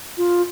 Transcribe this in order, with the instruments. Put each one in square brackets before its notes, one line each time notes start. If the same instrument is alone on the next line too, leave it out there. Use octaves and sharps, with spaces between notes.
[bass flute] F4